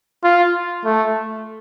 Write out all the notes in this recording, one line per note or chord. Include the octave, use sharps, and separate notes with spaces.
F4
A3